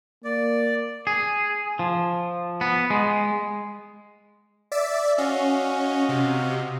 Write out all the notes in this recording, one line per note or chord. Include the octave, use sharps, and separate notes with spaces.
A#3 D5
G#4
F3
B3
G#3
D5 E5
C#4 F#4 D#5 F5
C3